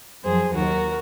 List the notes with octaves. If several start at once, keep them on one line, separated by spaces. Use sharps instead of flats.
F#2 F3 G#4 C5
D#2 D#3 F#3 F#4 A#4